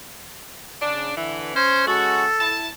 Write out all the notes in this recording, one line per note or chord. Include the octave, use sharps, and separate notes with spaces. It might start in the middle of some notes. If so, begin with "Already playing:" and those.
C#3 D4
D3 E3
C#4 C5
G#3 C#4 F#4 A4
E4 A5